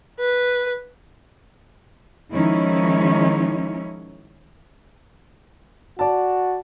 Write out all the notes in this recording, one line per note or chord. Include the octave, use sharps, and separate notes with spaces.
B4
D#3 F3 G#3 C#4 D#4 E4
F#4 D5 A5